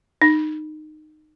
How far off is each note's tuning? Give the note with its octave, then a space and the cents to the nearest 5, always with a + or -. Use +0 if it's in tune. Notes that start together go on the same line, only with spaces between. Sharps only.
D#4 -20